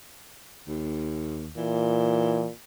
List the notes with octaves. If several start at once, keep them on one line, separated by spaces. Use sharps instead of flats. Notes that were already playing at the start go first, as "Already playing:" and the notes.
D#2
A#2 E3